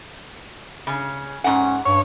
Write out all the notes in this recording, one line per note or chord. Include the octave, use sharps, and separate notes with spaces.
C#3
G#2 C#4 F#5
G2 C#5